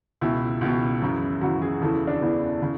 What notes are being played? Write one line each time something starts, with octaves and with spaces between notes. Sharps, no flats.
C#2 B2 E4
C#2 B2
F#2 C#3 E3
F#2 C#3 E3 F#4
G#4
E2 C#3 E3 A4
E4
D4
E2 C#3 E3 B3
C#3